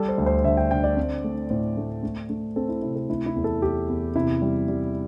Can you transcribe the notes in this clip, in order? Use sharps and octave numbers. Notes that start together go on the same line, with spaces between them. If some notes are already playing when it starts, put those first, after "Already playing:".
Already playing: G3 A4
C5
D2
C5
D3 E5
G5
D3 G5
D5
C4
A3
A2 C5
A3
A3
A3
C4 A4
E4
C3 E4
A4
A3 E4
E4
E2
A4
E2 G4
E2
C3 E4
G3
G3